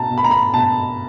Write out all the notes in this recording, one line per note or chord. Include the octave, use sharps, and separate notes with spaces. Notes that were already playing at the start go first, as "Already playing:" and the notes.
Already playing: B2 A5 A#5
B2
B5
A#5
B5
B2 A5